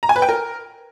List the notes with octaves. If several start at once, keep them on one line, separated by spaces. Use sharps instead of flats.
A#5
G#5
B4
G5
A#4